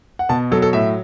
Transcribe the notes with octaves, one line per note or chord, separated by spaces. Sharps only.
F#5
B2 A5
F#3 A4
A4
A2 E5